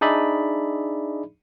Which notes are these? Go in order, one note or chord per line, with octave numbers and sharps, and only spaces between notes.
D4 D#4 G#4 D5 E5 B5